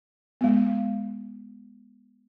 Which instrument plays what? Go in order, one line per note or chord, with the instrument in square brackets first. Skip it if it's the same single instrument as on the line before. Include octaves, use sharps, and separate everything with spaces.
[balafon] G#3 B3